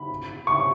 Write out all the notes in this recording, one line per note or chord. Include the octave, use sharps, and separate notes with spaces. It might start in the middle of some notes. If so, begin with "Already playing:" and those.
Already playing: B5
C#6